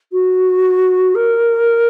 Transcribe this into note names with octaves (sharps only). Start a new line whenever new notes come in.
F#4
A#4